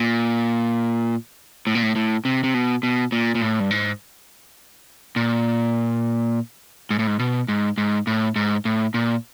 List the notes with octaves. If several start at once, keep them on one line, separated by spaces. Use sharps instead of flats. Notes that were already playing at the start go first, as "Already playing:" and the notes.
Already playing: A#2
A2
A#2
A2
A2
C3
C3
B2
B2
A#2
A#2
A2
G2
G#2
A#2
G#2
A2
G#2
B2
G#2
G#2
A2
G#2
A2
A#2